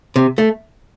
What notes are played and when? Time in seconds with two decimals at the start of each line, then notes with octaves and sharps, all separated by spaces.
0.16 C3
0.38 A3